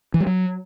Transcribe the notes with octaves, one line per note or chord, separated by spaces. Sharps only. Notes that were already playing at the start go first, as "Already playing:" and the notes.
E3
G3
F#3